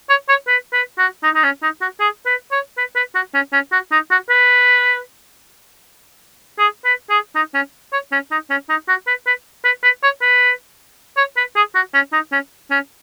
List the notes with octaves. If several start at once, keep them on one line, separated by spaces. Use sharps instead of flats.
C#5
C#5
B4
B4
F#4
D#4
D#4
C#4
D#4
F#4
G#4
B4
C#5
B4
B4
F#4
C#4
C#4
F#4
D#4
F#4
B4
G#4
B4
G#4
D#4
C#4
C#5
C#4
D#4
C#4
D#4
F#4
B4
B4
B4
B4
C#5
B4
C#5
B4
G#4
F#4
C#4
D#4
C#4
C#4